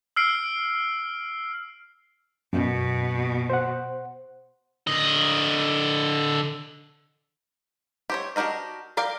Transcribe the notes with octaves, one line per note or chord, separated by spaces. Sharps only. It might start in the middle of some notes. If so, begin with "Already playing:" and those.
E6 F6 C7 D7
F#2 B2
C5 F#5
D3 D#5
G4 C5 C#5
D4 F#4 G4 A#4 D#5
A#4 D5 F5 G5